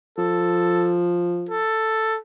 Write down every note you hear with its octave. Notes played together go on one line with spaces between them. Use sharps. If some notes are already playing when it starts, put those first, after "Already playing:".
F3 A4
A4